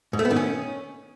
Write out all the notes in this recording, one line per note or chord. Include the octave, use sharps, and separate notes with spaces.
G#2
A3
B3
D#3
C#4